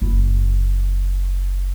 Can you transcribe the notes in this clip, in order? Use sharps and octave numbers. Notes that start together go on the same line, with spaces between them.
F#1 E4